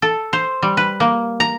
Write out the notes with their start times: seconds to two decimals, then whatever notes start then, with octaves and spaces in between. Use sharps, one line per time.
0.02 A4
0.33 C5
0.63 G3
0.77 B4
1.00 A#3
1.40 A#5